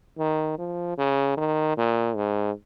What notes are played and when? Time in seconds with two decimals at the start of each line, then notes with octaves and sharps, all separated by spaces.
0.18 D#3
0.58 F3
0.98 C#3
1.37 D#3
1.77 A#2
2.16 G#2